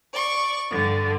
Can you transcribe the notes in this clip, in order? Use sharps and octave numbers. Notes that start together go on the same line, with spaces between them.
D5 C#6
G2 D3